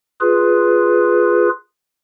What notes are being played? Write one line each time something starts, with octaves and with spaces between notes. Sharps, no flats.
F4 G#4 B4